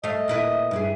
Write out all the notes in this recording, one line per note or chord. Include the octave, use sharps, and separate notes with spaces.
A3 D#5 F5
A#2 E4 B4
G2 E4 G#4